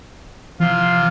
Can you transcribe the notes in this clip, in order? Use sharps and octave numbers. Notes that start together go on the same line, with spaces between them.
C3 E3 F3 F4